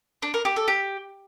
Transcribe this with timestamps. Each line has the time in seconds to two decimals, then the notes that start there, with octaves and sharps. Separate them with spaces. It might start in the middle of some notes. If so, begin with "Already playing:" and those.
0.22 D4
0.34 A#4
0.45 G4
0.56 A4
0.68 G4